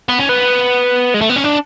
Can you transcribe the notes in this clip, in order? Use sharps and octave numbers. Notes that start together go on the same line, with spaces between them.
B3
C#4
B3
G#3
A3
B3
C#4
D4